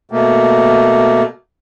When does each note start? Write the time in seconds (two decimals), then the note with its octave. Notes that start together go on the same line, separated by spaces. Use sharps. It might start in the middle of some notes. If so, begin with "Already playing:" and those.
0.11 B2 A3 A#3